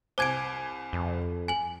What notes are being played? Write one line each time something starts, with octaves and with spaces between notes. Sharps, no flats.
C2 C5 G#5 D6 G#6 D7
F2
G#5 F#7